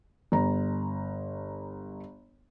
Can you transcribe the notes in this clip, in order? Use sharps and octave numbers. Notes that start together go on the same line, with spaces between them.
G1 A#5